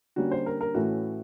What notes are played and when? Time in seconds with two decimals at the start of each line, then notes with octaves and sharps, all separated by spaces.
0.16 D3 G3 A#3 C#4 F#4
0.31 C5
0.46 A#4
0.61 A#4
0.74 A2 E3 A3 C#4 F#4